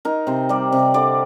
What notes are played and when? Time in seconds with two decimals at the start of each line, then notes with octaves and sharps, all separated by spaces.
0.05 D#4 A#4
0.27 C3 C5
0.49 G3 D5
0.72 C3
0.94 D3 D5